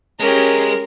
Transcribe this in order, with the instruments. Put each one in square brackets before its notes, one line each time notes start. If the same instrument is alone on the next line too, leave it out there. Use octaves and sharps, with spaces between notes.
[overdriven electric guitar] G#3 [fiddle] C#4 G4 [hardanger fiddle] A#4